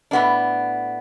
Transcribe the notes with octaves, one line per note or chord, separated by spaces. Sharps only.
A2 B3 D4